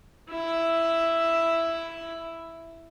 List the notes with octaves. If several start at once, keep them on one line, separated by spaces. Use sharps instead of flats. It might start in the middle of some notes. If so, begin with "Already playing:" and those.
E4 E5